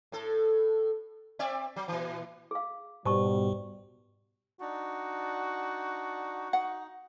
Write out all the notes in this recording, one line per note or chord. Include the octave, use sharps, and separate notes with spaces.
A2 A4
C4 D5 E5
F#3
A#2 E3
G#4 F5
G#2 B2 G3 C5 A5 C#6
D4 D#4 F#4
D#4 F#5